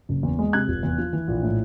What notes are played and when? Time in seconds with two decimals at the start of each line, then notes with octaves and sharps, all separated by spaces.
0.09 F#1
0.23 E2
0.39 G#3
0.53 C3 F#6 G#6
0.68 F1
0.83 E2
0.98 F3
1.13 E3
1.28 A#1
1.43 A2